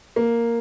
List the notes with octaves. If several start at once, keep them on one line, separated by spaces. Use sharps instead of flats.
A#3